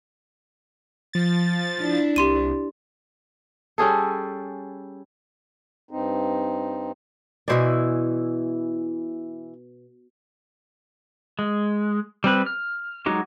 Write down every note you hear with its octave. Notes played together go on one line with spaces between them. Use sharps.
F3 A6
D4 E4
C2 G4 C6 D#7
G3 C#4 G#4 A4
G2 C4 D#4
B2 E3 E4 C5 D5 G#5
G#3
G3 C4 B4
F6
F#3 G#3 D#4 F#4 G4